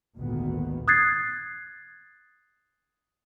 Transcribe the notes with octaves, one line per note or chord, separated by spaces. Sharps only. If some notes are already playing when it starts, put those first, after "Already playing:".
G#1 D2 A#2 D#3 B3
D#6 F#6 G#6 A6 C7